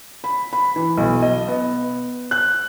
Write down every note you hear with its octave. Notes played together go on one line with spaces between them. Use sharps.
B5
B5
E3
B1
D#5
B3
F#6